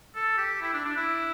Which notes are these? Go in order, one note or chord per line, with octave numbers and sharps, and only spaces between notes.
A4
G4
E4
D4
D4
E4